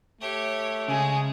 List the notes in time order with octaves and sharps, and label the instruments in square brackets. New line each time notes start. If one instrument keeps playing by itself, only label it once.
[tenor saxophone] A3 [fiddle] G4 C#5
[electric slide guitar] C#3 [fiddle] G#3 [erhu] G#5